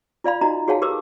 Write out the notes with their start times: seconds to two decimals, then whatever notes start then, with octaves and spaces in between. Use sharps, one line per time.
0.24 F4 D5 F5 B5
0.41 D#4 F#4 D#5 A#5
0.68 F#4 G#4 C#5 F5 F#5 A5
0.82 G4 A#4 B4 D6 E6